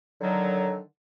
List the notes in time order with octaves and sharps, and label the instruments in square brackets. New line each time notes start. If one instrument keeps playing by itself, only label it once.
[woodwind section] D3 D#3 F#3